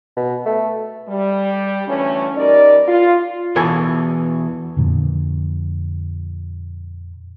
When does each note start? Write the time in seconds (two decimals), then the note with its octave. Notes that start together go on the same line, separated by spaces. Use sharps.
0.17 B2
0.46 A3
1.09 G3
1.88 D2 E3 A3 C#4
2.36 G3 D#4 A#4 D5
2.88 F4
3.56 E2 B2 E3 A4 G#5
4.77 F2 A#2 D3